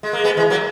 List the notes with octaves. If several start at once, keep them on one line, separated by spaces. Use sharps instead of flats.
G#3
A#3
G#3 B3
E3 G#3
F#3 A#3